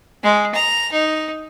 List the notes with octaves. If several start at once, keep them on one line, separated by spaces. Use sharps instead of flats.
G#3
A#5
D#4